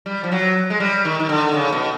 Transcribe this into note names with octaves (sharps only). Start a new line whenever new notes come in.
G3
F3
F#3
G#3
G3
D#3
D#3
D3
C#3
B2